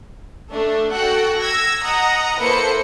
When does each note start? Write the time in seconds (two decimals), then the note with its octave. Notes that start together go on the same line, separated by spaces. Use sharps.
0.51 A3 D4
0.93 F#4 A4 F#5 G5
1.39 E6 G#6 A#6
1.82 D#5 F#5 A#5 D#6
2.39 A#3 E4 A4 B4 C5 C#7